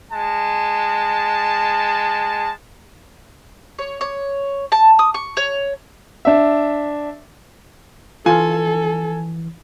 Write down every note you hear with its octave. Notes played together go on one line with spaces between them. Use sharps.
G#3 A5
C#5
C#5
A5
D#6
C#6
C#5
D4 E5
E3 F4 A4 G#5